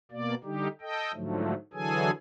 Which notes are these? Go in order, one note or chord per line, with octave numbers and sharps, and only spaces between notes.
B2 A#3 D5
D3 G3 D#4 G4
A4 D#5 G5
G#2 D3 F3 F#3 A3
D3 E3 F#3 G#4 A4 G#5